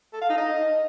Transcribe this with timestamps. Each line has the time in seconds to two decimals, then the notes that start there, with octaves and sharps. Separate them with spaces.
0.13 A4
0.21 F5
0.30 D#4
0.38 D#5